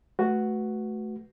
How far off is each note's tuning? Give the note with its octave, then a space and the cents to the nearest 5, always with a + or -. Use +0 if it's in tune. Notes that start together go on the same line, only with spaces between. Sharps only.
A3 -20 F#4 +0 B4 +0